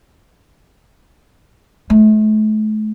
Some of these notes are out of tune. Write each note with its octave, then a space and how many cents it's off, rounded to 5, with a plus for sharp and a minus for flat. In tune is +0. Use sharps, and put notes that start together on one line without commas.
A3 -40